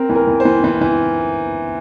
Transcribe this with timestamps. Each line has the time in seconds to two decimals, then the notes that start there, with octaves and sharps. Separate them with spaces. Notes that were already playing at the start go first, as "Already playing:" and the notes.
Already playing: C4 A#4
0.10 E3
0.15 A#4
0.27 E3
0.40 C5
0.45 E3
0.64 E3
0.81 E3